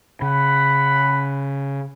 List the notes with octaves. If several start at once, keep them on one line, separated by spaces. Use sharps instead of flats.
C#3 F#5 B5